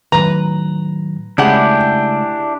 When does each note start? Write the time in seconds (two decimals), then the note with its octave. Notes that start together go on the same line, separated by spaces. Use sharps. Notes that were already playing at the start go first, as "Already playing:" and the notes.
0.12 A2 D#3 F#3 B4 A#5
1.38 C#3 G#3 A3 D4 E4 G4 G#4 F#5